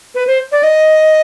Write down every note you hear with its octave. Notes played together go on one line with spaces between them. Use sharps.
B4
C5
D5
D#5